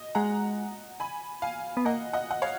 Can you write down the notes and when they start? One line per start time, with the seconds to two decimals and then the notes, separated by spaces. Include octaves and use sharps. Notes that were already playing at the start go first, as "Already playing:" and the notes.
Already playing: D#5
0.15 G#3 F#5 A#5
1.00 G#5 B5
1.42 F5 G#5
1.77 B3
1.85 A#3 D#5 F#5
2.13 D#5 F#5
2.31 F#5
2.42 C#5 F5